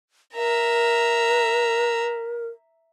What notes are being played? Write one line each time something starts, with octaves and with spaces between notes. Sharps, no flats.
A#4 E5 A#5